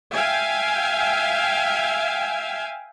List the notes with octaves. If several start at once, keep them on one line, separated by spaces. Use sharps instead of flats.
E5 F5 G5 G#5